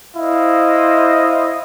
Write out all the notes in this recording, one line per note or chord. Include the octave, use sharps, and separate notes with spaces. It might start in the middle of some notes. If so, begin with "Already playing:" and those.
E4 C5 D#5 F5